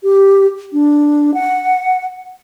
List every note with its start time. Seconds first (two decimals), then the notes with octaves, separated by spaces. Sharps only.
0.03 G4
0.73 D4
1.34 F#5